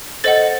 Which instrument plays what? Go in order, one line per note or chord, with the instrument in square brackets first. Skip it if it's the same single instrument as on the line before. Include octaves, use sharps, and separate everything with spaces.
[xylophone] A4 C5 D#5 F#5 A6